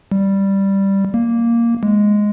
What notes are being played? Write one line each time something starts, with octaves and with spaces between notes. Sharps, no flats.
G3
A#3
G#3